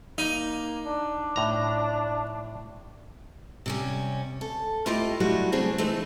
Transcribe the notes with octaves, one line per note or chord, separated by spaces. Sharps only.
A#3 D#4
D4
A2 A#5
C3 G3 C#4
A4
A3 E4 F4 G4 D#5 G5
F#3 G3 A3 E4 F#4
C#3 A3 C4 D4 E4 G#4
E3 A3 C4 D#4